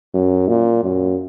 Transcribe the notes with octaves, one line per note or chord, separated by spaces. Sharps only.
F#2
A#2
F#2